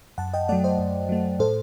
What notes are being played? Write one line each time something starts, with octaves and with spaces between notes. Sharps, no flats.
F#2 F#5 A5
D#5 G5
F#3 A3 D5 F#5
C5 D#5
F#2
F#3 A3
A2 A4 C5